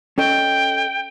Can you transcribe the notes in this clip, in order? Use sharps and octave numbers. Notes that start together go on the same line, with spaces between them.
C#4 A4 D#5 G5